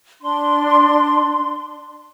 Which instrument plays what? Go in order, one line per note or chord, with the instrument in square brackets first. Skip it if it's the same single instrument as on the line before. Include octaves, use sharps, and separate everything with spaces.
[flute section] D4 C6